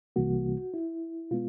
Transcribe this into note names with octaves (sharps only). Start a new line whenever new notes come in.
C2 C3 E3 G3 A#3 F#4
E4
B2 G#3 B3 F4